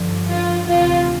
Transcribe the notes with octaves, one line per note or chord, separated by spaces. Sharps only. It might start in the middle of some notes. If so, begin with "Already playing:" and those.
Already playing: G2 D3 F3
F4
D2 C3 E3 F4